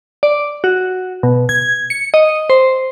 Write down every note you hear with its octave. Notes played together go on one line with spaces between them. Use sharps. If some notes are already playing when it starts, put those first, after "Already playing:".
D5
F#4
B2
G#6
C#7
D#5
C5